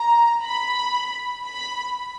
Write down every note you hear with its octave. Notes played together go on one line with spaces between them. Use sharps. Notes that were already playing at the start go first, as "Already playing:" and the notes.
Already playing: A#5
B5
B5